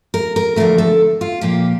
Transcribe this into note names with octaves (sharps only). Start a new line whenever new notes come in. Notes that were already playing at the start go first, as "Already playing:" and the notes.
A#4
A#4
E2 D3 F3 A3 A#4
A4
F4
A#2 F3 A#3 G4